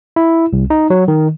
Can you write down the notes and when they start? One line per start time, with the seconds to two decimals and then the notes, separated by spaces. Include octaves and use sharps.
0.16 E4
0.53 C2
0.70 D#4
0.90 F#3
1.08 D#3